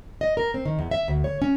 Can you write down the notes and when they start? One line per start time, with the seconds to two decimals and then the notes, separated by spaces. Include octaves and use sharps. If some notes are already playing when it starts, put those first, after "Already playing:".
0.21 D#5
0.37 A#4
0.54 C4
0.65 D#3
0.79 E2
0.91 E5
1.08 D2
1.24 C#5
1.42 C#4